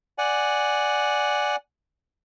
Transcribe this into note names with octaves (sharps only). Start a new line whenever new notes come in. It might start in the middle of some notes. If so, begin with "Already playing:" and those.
D5 F#5 G#5